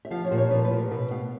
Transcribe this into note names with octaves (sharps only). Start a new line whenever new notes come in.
E5
F3 F5
C#5
A#2 C5
C#5
F3 B4
B4
A#2
A#4
B2 B4
B3 F5